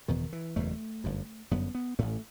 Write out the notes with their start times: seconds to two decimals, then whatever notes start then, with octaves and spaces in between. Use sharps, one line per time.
0.08 F#1 E2 B2 D#3
0.33 E3
0.56 F#1 E2 B2 A3
1.04 G1 F#2
1.51 G1 F#2 B3
1.75 B3
1.99 A1 A2 A3